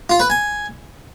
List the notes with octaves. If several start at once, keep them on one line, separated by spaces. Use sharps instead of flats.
F4
B4
G#5